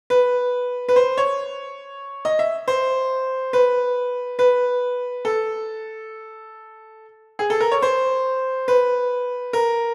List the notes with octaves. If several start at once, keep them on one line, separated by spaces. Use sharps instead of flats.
B4
B4
C5
C#5
D#5
E5
C5
B4
B4
A4
G#4
A4
A#4
C#5
C5
B4
A#4